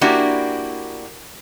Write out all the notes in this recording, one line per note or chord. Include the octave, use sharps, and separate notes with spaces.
A#3 D4 E4 F#4 G4